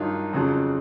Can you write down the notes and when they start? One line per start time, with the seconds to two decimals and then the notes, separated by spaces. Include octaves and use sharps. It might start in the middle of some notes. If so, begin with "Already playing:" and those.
Already playing: G2 D#3 F#3 D#4 F4
0.33 F2 C#3 F#3